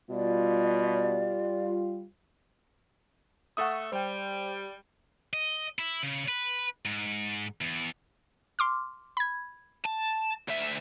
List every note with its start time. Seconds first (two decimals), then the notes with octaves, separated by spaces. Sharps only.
0.10 B2 G3 F4 D5
3.57 A3 A4 E5 F#5 C#6 D#6
3.92 G3 C5 G5
5.33 D#5
5.79 E4
6.03 C#3
6.28 B4
6.85 G#2
7.61 E2
8.59 C6 D6 F6
9.17 B5 G#6
9.85 A5
10.49 D2 E5